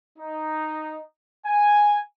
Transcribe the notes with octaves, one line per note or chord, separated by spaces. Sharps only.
D#4
G#5